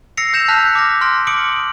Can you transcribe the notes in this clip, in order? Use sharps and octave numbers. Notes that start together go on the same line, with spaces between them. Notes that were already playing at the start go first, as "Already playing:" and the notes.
E6 A#6 C7 C#7 F7
E6 G6 A#6 E7 F7
A5 F6 F#6 B6 F7
D6 F6 A#6
C6 F6 A#6 D7
D6 D#6 C#7 D7 F#7